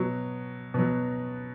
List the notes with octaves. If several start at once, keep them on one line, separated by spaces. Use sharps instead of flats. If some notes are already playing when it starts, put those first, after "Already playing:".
Already playing: B2 F#3
B2 F#3